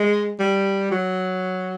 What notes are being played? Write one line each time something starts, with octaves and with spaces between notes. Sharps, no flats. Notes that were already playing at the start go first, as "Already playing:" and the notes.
Already playing: G#3
G3
F#3